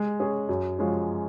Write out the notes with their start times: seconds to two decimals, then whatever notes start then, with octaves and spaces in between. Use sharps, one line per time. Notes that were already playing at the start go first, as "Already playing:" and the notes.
Already playing: G#3
0.20 C#4 G#4
0.49 F#2
0.79 F3 G#3 C#4